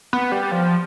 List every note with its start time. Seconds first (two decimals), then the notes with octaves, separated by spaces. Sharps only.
0.13 B3
0.32 G3
0.52 F3